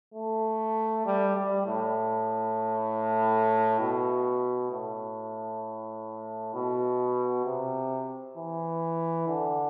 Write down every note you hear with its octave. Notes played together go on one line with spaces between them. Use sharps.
A3
G3
G3
A2
B2
A2
B2
C3
E3
D3